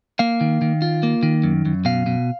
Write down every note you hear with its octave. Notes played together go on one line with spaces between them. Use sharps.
A#3 F5
D#3
D#3
F4
A#3
D#3
F#2
F#2
B2 F5
B2